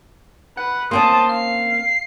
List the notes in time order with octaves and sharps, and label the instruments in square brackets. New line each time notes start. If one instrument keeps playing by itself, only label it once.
[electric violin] B4 [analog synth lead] F#5
[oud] A#3 C4 C#4 [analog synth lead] C5 [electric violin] A5 D#6
[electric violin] F5 [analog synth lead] C7